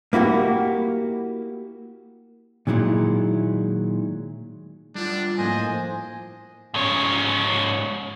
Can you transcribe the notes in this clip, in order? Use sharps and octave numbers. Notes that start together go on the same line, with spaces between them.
A#3 E4 F#4 G4
A#2 D#3 F#3 G#3 E4
G3 D4 F4
A2 F3 A#3 C5 D#5 G#5
G#2 C#5